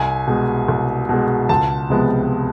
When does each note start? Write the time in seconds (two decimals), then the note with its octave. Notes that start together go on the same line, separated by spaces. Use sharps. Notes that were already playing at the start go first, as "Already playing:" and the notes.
Already playing: C2 G#5
0.27 B2 G#3
0.68 C2
1.09 B2 G#3
1.49 C#2 A5
1.90 C3 F3 G#3 B3